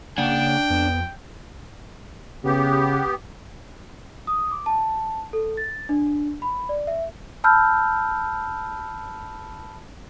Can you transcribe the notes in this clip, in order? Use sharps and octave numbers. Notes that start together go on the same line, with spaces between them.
C#3 A#3 D4 F#5 G5
F2 B3
C#3 B3 G4
D#6
D6
A5
A4
A6
D4
B5
D5
E5
A5 B5 E6 F6 G6